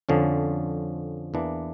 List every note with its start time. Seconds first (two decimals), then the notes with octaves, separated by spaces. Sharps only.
0.09 F2 D3 F3 C#4
1.34 E2 E3 A#3 D4